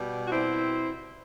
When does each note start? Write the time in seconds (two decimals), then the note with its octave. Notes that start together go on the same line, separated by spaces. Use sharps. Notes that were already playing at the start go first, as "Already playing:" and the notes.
Already playing: B2 G3
0.25 F#4
0.31 C4 E4